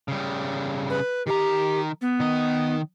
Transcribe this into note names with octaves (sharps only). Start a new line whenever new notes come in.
C#3 G3
B4
D#3 G4 A#5
B3
D#3 D#5